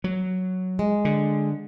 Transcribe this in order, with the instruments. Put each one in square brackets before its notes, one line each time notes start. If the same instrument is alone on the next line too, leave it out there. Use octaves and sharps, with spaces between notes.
[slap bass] F#3
[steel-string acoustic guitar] G#3
[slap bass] D3